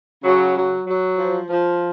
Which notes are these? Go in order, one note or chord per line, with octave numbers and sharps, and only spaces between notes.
C#3 F#3
F#3
F#3
F3
F3